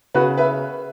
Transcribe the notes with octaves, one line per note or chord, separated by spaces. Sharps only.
C#3 F#4 B4
B4 E5